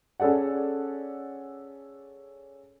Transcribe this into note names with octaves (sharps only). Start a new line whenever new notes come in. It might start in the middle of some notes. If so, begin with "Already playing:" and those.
C#4 G#4 A4 D5 F#5